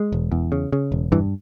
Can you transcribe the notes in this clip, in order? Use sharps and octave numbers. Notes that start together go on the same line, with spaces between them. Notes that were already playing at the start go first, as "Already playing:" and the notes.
Already playing: G#3
E1
E2
C#3
C#3
E1
G2 E3